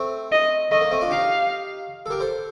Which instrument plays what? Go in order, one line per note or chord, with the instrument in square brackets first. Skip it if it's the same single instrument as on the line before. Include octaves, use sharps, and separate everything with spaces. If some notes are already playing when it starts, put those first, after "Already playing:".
Already playing: [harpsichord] A3 C4
[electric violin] D#5
[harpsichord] A3 [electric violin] D#5
[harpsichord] A#3
A3 C4
D4 F4
[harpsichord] D#4 G4 [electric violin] F5
[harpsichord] A4
G4 A#4
A4 C5